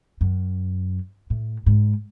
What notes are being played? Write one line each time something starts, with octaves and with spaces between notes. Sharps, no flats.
F#2
A2
G#2